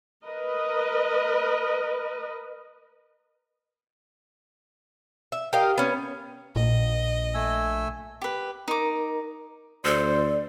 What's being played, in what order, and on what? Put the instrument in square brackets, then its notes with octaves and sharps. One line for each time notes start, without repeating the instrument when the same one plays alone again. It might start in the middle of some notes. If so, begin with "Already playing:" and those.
[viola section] A#4 B4 D#5
[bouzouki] E5
G4 A#4 D#5 F5
B3 C#4
[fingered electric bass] A#1 [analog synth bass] A#2 [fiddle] D#5
[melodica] A3 G#5 E6
[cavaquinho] G4 B4
[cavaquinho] D#4 D6 [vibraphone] A#4 A#5
[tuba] D2 [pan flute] A4 [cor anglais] C5 [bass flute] D5